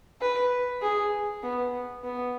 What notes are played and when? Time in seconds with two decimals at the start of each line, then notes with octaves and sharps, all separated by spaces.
0.21 B4
0.82 G#4
1.43 B3
2.04 B3